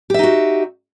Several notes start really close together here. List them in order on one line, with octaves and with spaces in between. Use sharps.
G4 E5 D#4 F#4